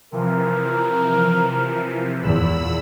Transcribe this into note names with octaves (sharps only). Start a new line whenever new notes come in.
C3 E3 F3 A#4
E2 A#2 B5 E6